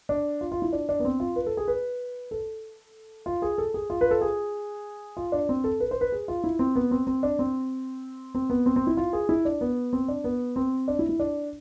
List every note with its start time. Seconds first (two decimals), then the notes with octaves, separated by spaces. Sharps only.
0.09 D4
0.41 F4
0.52 F4
0.62 E4
0.73 D4
0.89 D4
1.00 B3
1.05 C4
1.20 F4
1.36 B4
1.46 A4
1.57 G#4
1.68 B4
2.31 A4
3.26 F4
3.42 G#4
3.58 A4
3.74 G#4
3.90 F4
4.01 B4
4.11 A4
4.21 G#4
5.17 F4
5.32 D4
5.49 C4
5.64 A4
5.80 B4
5.91 C5
6.01 B4
6.12 G#4
6.28 F4
6.44 E4
6.59 C4
6.76 B3
6.91 C4
7.07 C4
7.23 D4
7.39 C4
8.35 C4
8.50 B3
8.66 C4
8.76 C4
8.87 E4
8.97 F4
9.13 G#4
9.29 E4
9.45 D4
9.61 B3
9.93 C4
10.08 D4
10.24 B3
10.56 C4
10.88 D4
10.99 E4
11.09 E4
11.20 D4